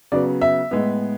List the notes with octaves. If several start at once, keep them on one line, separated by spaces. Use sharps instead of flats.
C#3 F#3 B3 D5
E5
A2 G#3 B3